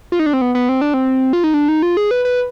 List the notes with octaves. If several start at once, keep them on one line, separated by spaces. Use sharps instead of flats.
F4
D#4
D4
C4
B3
B3
C4
D4
C4
F4
D#4
D4
D#4
F4
G#4
B4
B4